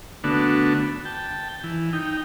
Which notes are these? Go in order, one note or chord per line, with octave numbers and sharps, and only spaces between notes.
D3 A3 B3 D4 F#4
G5 A5
E3
D#4 G5